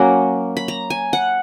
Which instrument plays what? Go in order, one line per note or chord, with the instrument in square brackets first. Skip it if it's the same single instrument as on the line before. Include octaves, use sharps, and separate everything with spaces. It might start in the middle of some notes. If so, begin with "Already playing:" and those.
Already playing: [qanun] F#3 A#3 C#4 F#5
B5
A#5
G#5
F#5